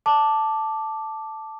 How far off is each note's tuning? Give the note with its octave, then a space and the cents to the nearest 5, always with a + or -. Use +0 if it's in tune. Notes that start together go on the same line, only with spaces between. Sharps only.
A5 +0 D6 +0